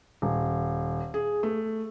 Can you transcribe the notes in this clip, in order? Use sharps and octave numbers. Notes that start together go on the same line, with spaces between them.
D#1
G#4
A3